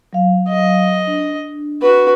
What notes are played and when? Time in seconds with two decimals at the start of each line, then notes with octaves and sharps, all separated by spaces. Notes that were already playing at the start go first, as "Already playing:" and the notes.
0.13 F#3 F5
0.48 D#5
1.07 D4
1.82 F#4 B4